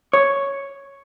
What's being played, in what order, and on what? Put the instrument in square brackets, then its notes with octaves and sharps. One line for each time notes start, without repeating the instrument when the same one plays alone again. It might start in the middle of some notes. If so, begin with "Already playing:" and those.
[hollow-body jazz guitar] C#5